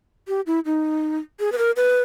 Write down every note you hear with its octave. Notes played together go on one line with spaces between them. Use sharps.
G4
E4
D#4
G#4
B4
A#4
B4